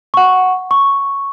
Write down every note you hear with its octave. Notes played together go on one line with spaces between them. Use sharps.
F#5 C#6
C#6